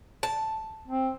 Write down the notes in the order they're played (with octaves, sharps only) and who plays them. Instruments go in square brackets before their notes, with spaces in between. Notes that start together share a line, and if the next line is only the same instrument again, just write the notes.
[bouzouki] A5
[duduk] C4